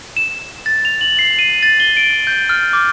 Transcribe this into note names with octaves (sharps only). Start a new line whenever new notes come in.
E7
A6
F7
F#7
C7
D#7
A6
G7
D7
G6
F6
D6